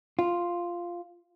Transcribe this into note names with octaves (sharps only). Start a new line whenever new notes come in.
F4